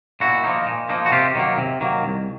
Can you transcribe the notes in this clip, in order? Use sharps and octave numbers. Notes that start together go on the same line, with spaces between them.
A#2 E4 F#4
F3 A#3 D#4
A#2
F3 A#3 D#4
F#4
C3 F4 G4
D#3 F#3 A#3
C3
D#3 F#3 A#3
C2